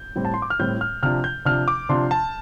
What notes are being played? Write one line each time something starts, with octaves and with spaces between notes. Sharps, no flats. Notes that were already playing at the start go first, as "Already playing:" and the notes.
Already playing: G6
A2 G3 C4
A5
C6
D6
F6
A2 G3 C4 G6
F6
C3 F3 D4 F6
G6
C3 F3 D4 F6
D6
C3 F3 D4 C6
A5